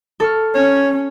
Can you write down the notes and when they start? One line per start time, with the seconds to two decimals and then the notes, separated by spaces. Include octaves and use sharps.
0.20 A4 C#6 F6
0.55 C#4 C#5